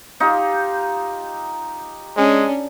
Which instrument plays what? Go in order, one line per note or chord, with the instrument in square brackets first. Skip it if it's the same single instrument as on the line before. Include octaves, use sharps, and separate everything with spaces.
[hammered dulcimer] D#4 F4 G4
[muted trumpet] G#3 [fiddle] C#4 D4